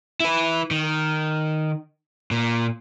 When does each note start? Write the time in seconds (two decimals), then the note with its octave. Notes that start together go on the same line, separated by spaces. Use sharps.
0.20 E4 B4
0.71 D#3
2.31 A#2